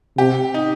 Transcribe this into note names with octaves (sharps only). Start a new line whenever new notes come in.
C3 G4
D#4